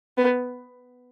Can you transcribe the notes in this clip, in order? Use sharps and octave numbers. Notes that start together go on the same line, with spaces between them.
B3